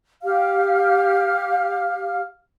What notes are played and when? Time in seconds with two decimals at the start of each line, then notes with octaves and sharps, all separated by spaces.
0.23 G4 F5 F6